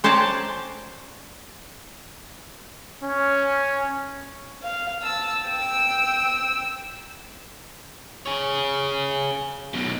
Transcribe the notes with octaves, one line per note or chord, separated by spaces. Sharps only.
C#4 C5 D5 G5 A5 A#5
C#4
F5
A5 E6
G5 E6
G#4 C#5
F#2 B2